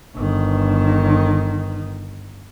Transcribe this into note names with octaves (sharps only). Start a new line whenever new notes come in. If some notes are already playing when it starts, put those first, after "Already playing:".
G1 D#3